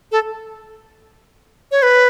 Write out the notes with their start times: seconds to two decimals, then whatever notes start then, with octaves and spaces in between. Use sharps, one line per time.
0.12 A4
1.72 C#5
1.83 B4